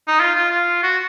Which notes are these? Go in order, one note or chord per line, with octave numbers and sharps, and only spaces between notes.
D#4
F4
F4
F4
F#4